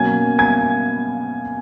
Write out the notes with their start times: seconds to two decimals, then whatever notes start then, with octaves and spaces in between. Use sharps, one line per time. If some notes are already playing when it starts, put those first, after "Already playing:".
Already playing: B2 F#3 A#3 C#4 G#5 G#6
0.38 G#5 G#6